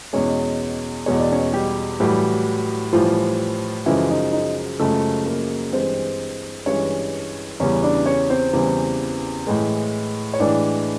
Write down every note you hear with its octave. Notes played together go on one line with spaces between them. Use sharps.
E2 B2 G#3 C#4 C#5
E2 B2 G#3 C#5
D5
C#4 C#5
G3 G4
A2 E3 F#3 G3 F#4
A2 E3 F3 G3 F4
F#2 C#3 E3 F3 G#3 E4
D#4
D#4
F#2 C#3 F3 G#3 A3 A4
A#3 A#4
G2 E3 G#3 C4 C5
G2 E3 G#3 C#4 C#5
E2 C#3 E3 G3 C#4 C#5
D4 D5
C#4 C#5
C4 C5
E2 C#3 E3 G3
A2 E3 G#3
C#5
A2 E3 G#3 D4 D5